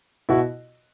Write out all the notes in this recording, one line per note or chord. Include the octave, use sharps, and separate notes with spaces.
B2 E4 F#4